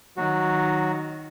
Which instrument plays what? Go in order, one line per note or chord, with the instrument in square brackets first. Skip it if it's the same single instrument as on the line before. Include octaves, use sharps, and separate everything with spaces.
[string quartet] D#3 [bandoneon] F#3 F#4